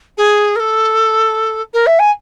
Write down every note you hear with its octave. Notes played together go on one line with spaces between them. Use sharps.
G#4
A#4
A4
A#4
E5
G#5